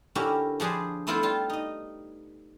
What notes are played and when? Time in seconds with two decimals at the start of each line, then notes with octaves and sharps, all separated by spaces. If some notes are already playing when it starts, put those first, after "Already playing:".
0.15 D3 C#4 E4 F#4 G4 A#4
0.60 F3 D4 G#4 B4 C5
1.07 A3 B3 E4 F4 A4 C5
1.23 G3 F4 A5
1.50 D#4 D#5